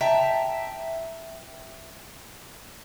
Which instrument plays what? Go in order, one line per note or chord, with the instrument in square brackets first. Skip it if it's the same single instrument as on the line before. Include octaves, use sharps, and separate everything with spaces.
[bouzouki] E5 G5 A5 A#5